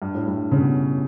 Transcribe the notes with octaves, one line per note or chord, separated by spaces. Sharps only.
G2
A2
G2
C#3
B2